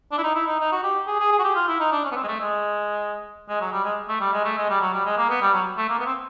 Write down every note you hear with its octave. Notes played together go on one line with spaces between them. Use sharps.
D4
E4
D#4
E4
D#4
D#4
F#4
G4
G#4
G#4
G#4
F#4
G4
F4
E4
D#4
D4
C#4
B3
C4
G#3
A3
G#3
G#3
F#3
G3
G#3
A3
G3
G#3
A3
G#3
G3
F#3
G3
G#3
A#3
B3
G3
F#3
A3
A#3
B3
C4